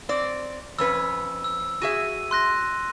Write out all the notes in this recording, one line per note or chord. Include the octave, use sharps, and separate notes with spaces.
C4 D5
F2 C#4 B4 E6
E6
F#4 G#4 E5 D#7
C6 F#6 A#6